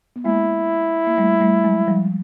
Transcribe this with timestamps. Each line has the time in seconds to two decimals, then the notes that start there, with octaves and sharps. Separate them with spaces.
0.16 B3
0.25 G#3 A#3 E4
1.07 A#3
1.18 G3 A3
1.41 G3 A3
1.64 F#3 G#3
1.87 F3 G3